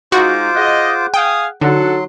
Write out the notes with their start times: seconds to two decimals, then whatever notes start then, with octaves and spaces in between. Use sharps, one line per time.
0.12 G#3 D#4 F4 F#4 C5 D6
0.55 G#4 D#5 F#5 F#6
1.14 F5 G5 G#5 D#6
1.61 D3 F#3 D#4 F#4 A4 F#5 C6